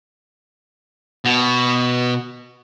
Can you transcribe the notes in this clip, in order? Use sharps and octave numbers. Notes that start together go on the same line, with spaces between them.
B2